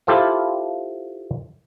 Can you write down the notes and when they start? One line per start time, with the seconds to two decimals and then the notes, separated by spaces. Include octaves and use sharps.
0.07 E4 F4 G4 A4 C5 F5